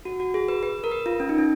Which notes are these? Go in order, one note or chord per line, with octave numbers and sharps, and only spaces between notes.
F#4
F#4
G#4
B4
B4
A#4
B4
F4
C#4
D#4
C#4